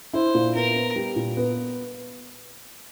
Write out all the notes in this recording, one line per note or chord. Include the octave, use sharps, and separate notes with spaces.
E4 C5
A#2
B3 A#4
B3
G3
A#2
B3